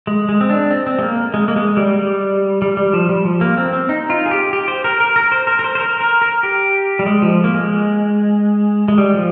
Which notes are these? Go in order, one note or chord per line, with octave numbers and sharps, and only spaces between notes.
G#3
G#3
C4
D4
C4
C4
G#3
A#3
G#3
A#3
G#3
G3
G3
G3
G3
F3
G3
F3
A#3
C4
C4
D#4
F4
G#4
G4
G4
C5
A#4
A#4
A#4
C5
A#4
A#4
C5
C5
A#4
A#4
A#4
G4
G3
G#3
F3
A#3
G#3
G#3
G3
F3